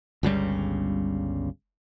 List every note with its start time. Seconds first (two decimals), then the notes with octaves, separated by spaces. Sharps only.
0.23 G1 C#2 C#3 G3